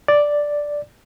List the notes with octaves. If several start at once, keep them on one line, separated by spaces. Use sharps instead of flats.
D5